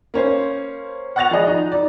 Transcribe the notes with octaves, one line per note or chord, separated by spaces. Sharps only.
A#3 C#4 C5
F#5 C#6 F#6 A6 A#6 F7
F3 G#4 D5 D#5
D#4
D#4 D5